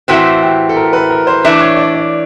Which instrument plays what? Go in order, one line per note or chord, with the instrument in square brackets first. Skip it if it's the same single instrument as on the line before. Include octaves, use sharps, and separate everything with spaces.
[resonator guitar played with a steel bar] A2 E3 A3 C4 [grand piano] F#4
[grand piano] G4
A4
A#4
B4
A#4
C5
[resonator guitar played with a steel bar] E3 A3 D4
[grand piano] C#5
D5
D5